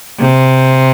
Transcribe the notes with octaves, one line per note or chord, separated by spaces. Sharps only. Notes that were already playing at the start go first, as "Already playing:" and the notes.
C3